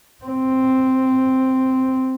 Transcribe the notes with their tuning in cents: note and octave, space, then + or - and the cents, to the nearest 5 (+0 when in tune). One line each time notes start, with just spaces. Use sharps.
C4 +0